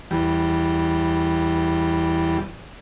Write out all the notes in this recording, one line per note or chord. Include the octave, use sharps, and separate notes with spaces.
E2 G3